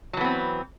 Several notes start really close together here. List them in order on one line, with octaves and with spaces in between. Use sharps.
F#3 E3 B3 C4